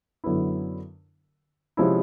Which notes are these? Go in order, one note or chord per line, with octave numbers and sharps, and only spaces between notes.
F#2 D3 F#3 B3 E4
C3 F3 G#3 C#4 E4